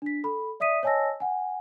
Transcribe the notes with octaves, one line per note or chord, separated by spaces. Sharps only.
D4 B6
A4 B5
D5 E5 D#6 B6 D#7
C#5 D#5 G#5 A5 E6 A#6
F#5 G#5